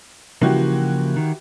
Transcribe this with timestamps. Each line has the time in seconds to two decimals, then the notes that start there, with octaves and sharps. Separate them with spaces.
0.42 C#3 E3 F3 A#3 F#4 G4
1.16 D#3